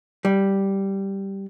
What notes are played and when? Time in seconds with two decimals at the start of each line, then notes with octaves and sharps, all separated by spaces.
0.25 G3